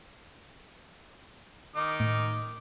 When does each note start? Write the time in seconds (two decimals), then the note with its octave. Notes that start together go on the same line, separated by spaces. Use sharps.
1.76 D#3 D#4 D6
2.00 A2